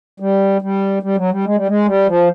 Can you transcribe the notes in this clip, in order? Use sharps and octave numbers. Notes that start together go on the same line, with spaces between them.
G3
G3
G3
F#3
G3
G#3
G3
G#3
G3
F3